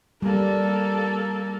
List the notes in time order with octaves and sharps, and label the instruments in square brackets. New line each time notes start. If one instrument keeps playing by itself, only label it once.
[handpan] G3 [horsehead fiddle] A#3 A4